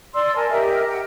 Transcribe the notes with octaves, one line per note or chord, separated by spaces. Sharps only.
D5 C6 E6
A#4 G#5 A5
G4 A#4 D#5 E5
F#5 G5